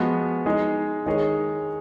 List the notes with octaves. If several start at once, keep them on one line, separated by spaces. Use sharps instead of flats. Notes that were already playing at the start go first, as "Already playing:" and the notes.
Already playing: F3 G#3 B3 F#4
G#3 D#4 G#4
D#3 G#3 D#4 G#4 C#5